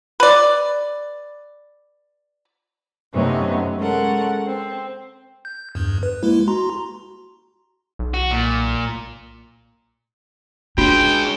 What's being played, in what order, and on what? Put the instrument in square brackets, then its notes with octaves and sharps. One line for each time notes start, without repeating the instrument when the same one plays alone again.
[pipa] B4 D5
[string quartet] F#2 C3 A3 B3 C#4 D#4
G#3 C#4 A4 A#4 F#5
C4
[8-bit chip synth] G6
E2 G2
B4
G#3 A#3 E4
F#4 A#5 C6
[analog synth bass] B1
[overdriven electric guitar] F#4
A#2
[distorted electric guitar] G#3 C#4 [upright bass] D4 [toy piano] F4 F#4 [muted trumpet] G5